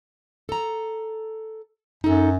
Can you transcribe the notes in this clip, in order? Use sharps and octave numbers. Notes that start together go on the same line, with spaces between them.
A4 A#5
F#2 D#4 A4